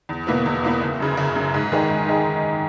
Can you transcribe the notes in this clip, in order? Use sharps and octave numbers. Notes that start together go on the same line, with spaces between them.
E2
B2 A#3 E4 B4
E2
B2 A#3 E4 B4
F#1
F#2 C#3
F#1
F#2 C#3
G#2
D#3 G#3 D#4 G#4
G#2
D#3 G#3 D#4 G#4